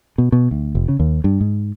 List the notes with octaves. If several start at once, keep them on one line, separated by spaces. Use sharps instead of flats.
B2
B2
D2
F1
C#3
D#2
G2
G#2